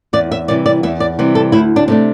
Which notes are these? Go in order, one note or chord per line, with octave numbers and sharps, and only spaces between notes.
E2 D5
E5
C3 E3 G3 D5
D5
E2 E5
D5
C3 E3 G3
A4
D2 E4
D4
C3 A3 D4